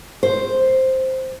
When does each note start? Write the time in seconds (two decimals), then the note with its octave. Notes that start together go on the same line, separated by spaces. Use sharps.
0.23 C5